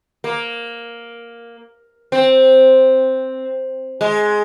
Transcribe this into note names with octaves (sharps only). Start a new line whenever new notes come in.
A#3
C4
G#3